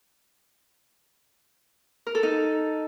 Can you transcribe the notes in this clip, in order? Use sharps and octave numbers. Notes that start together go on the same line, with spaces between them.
A#4
A4
D#4